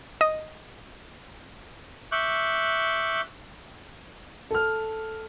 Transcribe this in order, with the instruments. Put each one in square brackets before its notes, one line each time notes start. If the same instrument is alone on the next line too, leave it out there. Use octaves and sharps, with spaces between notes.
[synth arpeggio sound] D#5
[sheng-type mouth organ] E5 C#6 D6 F#6 G6
[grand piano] A4 F6